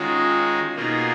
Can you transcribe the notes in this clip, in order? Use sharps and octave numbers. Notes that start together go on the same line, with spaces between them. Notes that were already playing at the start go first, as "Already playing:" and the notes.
Already playing: D#3 G#3 C#4 D#4 F4 F#4
B2 A#3 D#4 F4 F#4 G#4